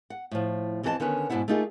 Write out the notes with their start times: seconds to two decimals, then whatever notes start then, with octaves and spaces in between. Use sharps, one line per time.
0.10 F#5
0.31 A2 F3
0.83 F2 E3 C4 A4 D#5 A5
1.00 D3 D#3 B3 C#4 B4
1.30 G#2 B2 G#3 D4 E4 F#5
1.48 A3 A#3 D#4 F4 G#4